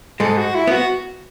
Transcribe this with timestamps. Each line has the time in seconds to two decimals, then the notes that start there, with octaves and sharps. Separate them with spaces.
0.20 G#2 G#3 A4
0.37 F#4
0.55 E4
0.67 B3
0.71 F#4